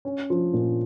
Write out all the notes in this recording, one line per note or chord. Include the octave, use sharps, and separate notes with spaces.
C#4
F3
A#2